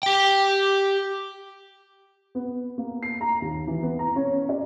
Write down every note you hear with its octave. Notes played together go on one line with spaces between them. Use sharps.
G4 G5
B3
A#3
C7
A#5
D#2
E3
B3
A#5
C#4
D5